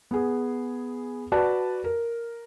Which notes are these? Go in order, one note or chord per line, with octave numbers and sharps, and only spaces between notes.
B3 G#4
F#4 B4 D5 A5
A#4